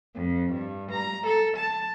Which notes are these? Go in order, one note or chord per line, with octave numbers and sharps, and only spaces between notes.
F2
G2
A#5
A4
A5